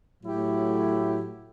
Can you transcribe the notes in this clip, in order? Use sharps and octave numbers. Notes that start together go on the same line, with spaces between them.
A2 F#3 A3 E4 G4